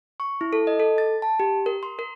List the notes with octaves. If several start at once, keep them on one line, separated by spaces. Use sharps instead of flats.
C#6
E4
A4
D#5
A4
A6
A5
G4
A#4
C6
A#4